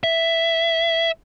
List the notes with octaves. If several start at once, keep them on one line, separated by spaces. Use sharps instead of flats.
E5